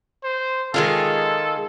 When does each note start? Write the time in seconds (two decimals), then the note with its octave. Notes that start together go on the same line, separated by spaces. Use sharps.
0.24 C5
0.74 D#3 G#3 F4 A4